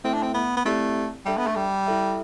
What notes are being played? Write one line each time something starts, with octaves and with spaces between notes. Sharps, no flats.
A3 C4 E4 A4 E5
D4
C4
B3
B3
A3 C4 E4 G4 D5
G3 D4 A4 E5 A5
B3
A3
G3
E4 A4 E5